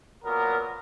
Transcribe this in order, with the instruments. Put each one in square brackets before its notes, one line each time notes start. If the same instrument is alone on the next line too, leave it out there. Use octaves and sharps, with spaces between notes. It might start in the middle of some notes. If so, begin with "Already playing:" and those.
[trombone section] A#2 F#3 B3 A#4